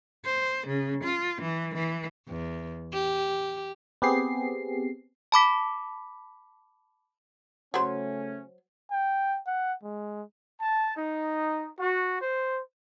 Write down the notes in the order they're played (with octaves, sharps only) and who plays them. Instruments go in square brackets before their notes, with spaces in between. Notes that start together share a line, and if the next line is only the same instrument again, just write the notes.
[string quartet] C5
C#3
F4
E3
E3
[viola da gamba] E2
G4
[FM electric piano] B3 C4 G4 G#4 C7
[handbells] A5 B5 D6 B6
[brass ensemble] C#3 A3 C#4 [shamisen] F#3 C5
[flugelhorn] G5
F#5
G#3
[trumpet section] A5
D#4
F#4
C5